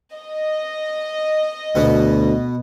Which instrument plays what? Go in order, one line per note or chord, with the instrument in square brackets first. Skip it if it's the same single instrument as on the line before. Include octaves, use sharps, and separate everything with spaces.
[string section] D#5
[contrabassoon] D2 [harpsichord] B2 B3